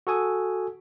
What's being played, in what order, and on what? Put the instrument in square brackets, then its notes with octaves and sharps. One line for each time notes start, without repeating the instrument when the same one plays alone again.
[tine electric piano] F#4 A4 G#5 D#6